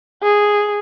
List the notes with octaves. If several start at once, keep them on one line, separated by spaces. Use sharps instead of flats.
G#4